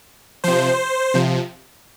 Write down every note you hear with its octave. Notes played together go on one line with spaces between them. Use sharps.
C3 F3 C5
C3 F3